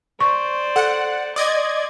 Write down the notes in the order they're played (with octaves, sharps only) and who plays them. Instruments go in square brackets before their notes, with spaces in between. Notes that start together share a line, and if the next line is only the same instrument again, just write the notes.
[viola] C5 D5 [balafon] C#6
[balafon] A4 [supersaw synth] F#5
[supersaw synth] D5 D#5 G#6 [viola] C6